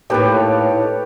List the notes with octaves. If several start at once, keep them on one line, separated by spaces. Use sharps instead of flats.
A2 A#3 D#4 G4 A4 B4 C#5